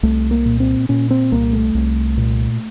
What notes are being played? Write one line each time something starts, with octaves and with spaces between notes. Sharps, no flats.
C2 A3
A#3
A#2
C4
A#2 C#4
C4
C2 A#3
A3
C2
A#2